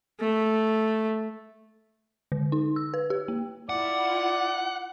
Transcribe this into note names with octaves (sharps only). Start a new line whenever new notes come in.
A3
D3
D#4
E6
B4
G4
A#3
E4 F4 D5 F#5